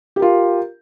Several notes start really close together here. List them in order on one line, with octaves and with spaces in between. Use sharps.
G4 A#4 F4